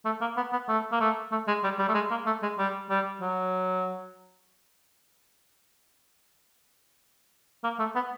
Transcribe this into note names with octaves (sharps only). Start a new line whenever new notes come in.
A3
A#3
B3
B3
A3
A#3
A3
A3
G#3
G3
G3
A3
G#3
A#3
A3
G#3
G3
G3
F#3
A#3
A3
B3